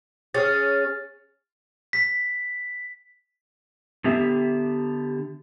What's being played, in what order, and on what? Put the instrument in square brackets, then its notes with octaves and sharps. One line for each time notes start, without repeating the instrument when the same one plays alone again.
[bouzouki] C#4 G#4 [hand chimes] F6 A6
[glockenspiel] B6
[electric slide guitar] D3 B3 G4 E5